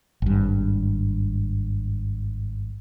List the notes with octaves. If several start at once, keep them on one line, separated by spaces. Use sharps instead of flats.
G#1 G2